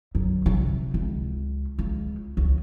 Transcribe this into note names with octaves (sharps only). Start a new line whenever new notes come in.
F#2
C3
C#2
C#2
C#2